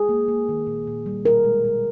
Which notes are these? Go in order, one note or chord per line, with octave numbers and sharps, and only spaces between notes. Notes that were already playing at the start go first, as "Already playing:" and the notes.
Already playing: G#4
A#3
A#3
D#3
A#2
A#2
G3
B2 A#4
G#3
B2